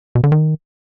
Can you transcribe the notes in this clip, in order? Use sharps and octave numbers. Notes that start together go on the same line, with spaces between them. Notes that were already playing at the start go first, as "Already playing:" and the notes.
B2
D3
D#3